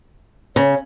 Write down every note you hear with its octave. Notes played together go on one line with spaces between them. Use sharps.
C#3 C#5